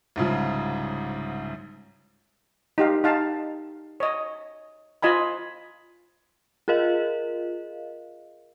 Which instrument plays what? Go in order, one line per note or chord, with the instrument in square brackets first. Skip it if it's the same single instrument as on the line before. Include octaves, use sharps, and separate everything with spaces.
[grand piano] C2 G#2 C#3 F3
[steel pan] D#4 G4 F5
D#4 F5 A5
C#5 D#5
F4 D#5 G#5 B5
[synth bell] F4 G#4 A#4 D#5 F5